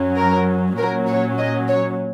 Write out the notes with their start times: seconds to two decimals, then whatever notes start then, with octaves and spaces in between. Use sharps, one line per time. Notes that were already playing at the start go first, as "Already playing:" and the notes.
Already playing: F#2 F#3 C#4
0.17 A#4
0.78 A#2 F#3 C#4 A#4
1.08 C#5
1.38 D#5
1.67 C#5